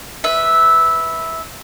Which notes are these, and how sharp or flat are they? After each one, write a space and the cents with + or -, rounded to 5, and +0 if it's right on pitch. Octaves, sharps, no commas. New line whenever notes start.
B4 +0 E5 -10